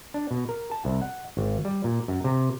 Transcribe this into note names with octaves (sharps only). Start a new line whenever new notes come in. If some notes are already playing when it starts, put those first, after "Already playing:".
D4
B2
A#4
A5
C2
F#5
G#1
G3
A#2
F#2
C3